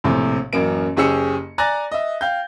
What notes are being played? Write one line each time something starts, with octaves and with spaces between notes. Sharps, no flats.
A#1 A2 C3
A1 F#2 A#3 D7
F#1 C#4 G4 G#4 E6 C#7
D5 G#5 A#5 F#6 A6 A#6
D#5 E5
F5 G5 G6